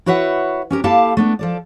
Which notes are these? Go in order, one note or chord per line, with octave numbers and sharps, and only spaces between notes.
E4 F#4 B4 C#5 E5 F#5
C#4 G4 A#4
A#3 E4 G4 A4 F5 A5
A3 B3 D4
F3 A4 D5